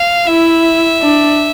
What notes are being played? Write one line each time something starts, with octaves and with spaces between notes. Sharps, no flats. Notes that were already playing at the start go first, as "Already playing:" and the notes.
Already playing: F5
E4 E5
D4